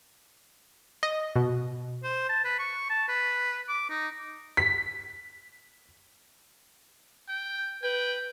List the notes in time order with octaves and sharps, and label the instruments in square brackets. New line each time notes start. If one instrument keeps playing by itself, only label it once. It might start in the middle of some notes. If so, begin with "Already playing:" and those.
[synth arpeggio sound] D#5
B2
[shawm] C5
A5
B4
C#6
A5
B4
D6
D#4
[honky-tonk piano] B6
[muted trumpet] G5
[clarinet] B4 [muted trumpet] G5